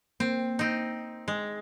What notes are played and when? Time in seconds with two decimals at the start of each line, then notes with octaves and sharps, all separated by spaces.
0.20 A#3 C4
0.59 C4 D#4
1.28 G#3